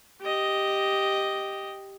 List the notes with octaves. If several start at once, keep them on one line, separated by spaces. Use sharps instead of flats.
G4 D#5